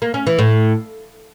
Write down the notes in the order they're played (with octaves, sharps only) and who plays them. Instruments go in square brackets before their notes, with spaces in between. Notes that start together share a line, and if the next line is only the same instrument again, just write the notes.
[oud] A#3
C#4
E3
A2